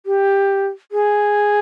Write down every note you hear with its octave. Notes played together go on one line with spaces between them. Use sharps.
G4
G#4